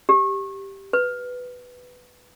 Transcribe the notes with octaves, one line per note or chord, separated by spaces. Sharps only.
G4
B4